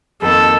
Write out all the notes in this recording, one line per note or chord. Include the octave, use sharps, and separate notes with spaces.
F2 D#3 A#3 A4